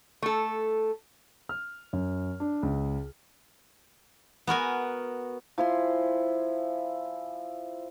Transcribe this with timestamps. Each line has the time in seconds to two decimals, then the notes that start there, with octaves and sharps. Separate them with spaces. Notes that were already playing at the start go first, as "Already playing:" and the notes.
0.22 A3 A4
1.49 F6
1.93 F#2
2.40 D4
2.63 C#2
4.47 B3 F#4 A#4 G#5
5.58 F3 E4 G#5 C6